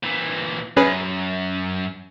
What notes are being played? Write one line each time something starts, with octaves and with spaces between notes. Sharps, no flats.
A#2 E3
F#2 C#4 G#4 B4